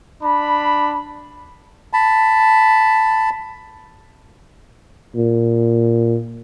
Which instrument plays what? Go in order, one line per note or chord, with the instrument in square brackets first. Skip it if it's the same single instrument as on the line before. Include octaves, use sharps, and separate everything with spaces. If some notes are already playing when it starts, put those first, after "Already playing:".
[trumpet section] D4 B5
[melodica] A5 B5
[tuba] A#2